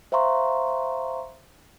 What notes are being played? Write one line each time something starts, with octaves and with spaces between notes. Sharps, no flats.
C5 E5 F5 A#5 C6 C#6